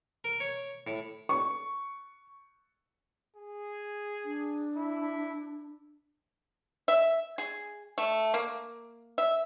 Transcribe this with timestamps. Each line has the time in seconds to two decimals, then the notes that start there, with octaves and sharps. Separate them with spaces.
0.24 A#4
0.40 C#5
0.87 A2
1.29 C#6
3.37 G#4
4.25 D4
4.76 E4
6.88 E5
7.38 G#4
7.98 A3
8.34 A#3
9.18 E5